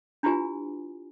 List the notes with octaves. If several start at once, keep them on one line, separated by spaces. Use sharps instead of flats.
D4 E4 F4 G4 B4 G#5